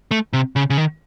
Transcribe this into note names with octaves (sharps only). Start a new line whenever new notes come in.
A3
C3
C#3
C#3
D#3